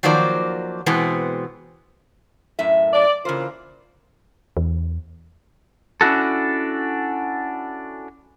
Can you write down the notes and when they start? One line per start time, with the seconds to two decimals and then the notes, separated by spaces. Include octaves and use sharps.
0.03 D#3 F3 F#3 A#3 C5 D5
0.86 B2 E3 G#3 B3 C4
2.59 F#2 A2 E5
2.93 D5
3.25 C#3 E3 A#3 F4 C5
4.57 E2
6.01 C#4 D4 E4 F#4 A4